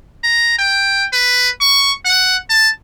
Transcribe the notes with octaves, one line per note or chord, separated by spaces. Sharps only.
A#5
G5
B4
C#6
F#5
A5